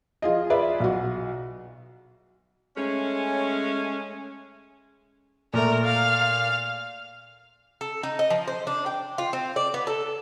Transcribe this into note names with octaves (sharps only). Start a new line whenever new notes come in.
F3 F4 G#4 D#5
F4 G#4 B4 D5 E5
B1 F#4
G#3 A3 C#4
A#2 A3 A#4
F5
A4
D#4
D#5
F3
C5
D4
G5
F4
C4
D5
B3
A4